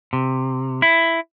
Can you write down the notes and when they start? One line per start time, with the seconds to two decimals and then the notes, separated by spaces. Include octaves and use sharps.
0.13 C3
0.82 E4